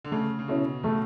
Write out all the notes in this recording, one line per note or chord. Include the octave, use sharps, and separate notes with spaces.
D3
C#3 A3
C#3
B2 C#4 E4 A4
A2 A3